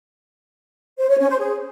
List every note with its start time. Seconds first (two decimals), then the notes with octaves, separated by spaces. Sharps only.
0.99 C5
1.09 C#5
1.19 C#4
1.29 C5
1.39 G#4